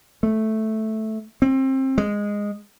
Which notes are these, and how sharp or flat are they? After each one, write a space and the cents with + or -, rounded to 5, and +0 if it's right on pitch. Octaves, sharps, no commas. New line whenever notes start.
A3 -5
C4 +25
G#3 -10